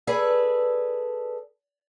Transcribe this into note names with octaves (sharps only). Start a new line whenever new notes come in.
G#4 A4 B4 D5